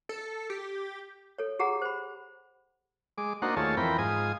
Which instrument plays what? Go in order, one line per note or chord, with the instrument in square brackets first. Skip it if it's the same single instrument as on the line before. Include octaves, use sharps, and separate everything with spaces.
[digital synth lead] A4
G4
[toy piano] A4 C#5
G4 G#4 F#5 A#5
C5 B5
[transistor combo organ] G#3 D6
A#3 D4 D#4 F#4 C5 F#5
D#2 A3 F4 G#4 C#5 A5
F2 E3 C4 A#4 G5 B5
G#2 F4 G#5 D#6